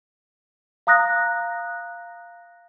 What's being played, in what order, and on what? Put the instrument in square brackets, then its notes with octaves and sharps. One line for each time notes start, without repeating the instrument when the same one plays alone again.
[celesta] F5 A#5 D#6 F#6 A#6